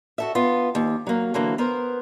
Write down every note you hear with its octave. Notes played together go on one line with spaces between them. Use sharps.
F#4 A4 E5
B3 F4
D#2
F#3 A#3
D3 E3 F#3 A#3
B3 A#4 C5